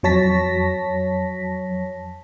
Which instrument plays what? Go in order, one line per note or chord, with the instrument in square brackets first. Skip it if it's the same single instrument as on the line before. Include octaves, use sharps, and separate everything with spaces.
[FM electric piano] F2 F#3 C#5 A5 A#6 B6